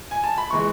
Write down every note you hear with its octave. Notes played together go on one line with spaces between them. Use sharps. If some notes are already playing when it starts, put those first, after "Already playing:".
G#5
A5
B5
E3 G#3 C#6